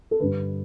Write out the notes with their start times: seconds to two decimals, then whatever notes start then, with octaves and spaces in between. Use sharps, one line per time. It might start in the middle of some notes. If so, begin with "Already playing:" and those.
0.11 A4
0.20 G2 D3 B4